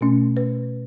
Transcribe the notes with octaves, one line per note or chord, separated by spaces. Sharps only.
B2 A3 C#4
B4